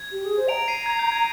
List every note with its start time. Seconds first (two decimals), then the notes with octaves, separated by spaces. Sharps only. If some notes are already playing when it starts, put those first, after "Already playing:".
Already playing: G#6
0.12 G4
0.25 G#4
0.37 C5
0.48 A#5 D7 F7
0.68 C7 D#7
0.86 G#6
0.99 G6
1.12 A#5 G#6